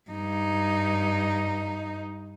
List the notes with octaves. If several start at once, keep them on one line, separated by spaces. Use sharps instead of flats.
G2 D#4